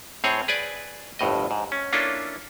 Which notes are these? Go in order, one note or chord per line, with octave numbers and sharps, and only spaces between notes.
A2 C4 G#4 C#5
G#4 B4 D5 G#5
G1 F2 A2 D#5
G#2
C#4
A#3 C#4 D4 E4 F4 A4